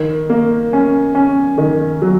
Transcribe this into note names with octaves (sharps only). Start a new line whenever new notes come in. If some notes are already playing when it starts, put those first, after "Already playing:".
Already playing: D#3
A#3
C#4
C#4
D#3
F#3